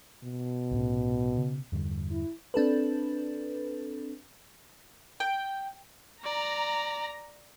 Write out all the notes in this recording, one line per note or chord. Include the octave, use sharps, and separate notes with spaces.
B2
C2 A2 C#4
C#3
E2 G2 D3
E4
C4 D4 A4 B4
G5
D5 A#5